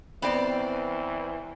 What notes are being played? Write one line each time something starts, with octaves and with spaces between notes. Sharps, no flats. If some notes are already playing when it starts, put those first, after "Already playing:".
E3 B3 C4 D5